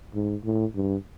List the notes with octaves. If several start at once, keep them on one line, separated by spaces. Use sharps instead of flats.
G#2
A2
G2